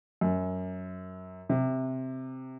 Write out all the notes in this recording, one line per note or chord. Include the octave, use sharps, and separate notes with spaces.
F#2
C3